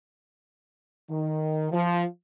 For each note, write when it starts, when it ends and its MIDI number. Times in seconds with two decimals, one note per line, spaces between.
1.10 1.68 51
1.71 2.04 53